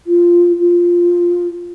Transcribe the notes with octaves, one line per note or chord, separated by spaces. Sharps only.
F4
F4